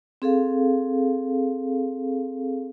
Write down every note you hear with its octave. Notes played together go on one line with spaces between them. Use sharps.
C4 G#4 A4 F5